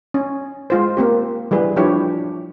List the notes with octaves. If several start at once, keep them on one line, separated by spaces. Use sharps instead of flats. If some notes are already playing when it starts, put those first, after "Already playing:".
C#4
G#3 F4 C5
A#3 C4 G4
E3 G3 G#4 B4
F3 D4 E4 G4 C#5